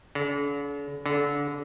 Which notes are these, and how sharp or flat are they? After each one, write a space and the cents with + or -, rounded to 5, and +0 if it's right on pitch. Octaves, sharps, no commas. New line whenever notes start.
D3 -45
D3 -25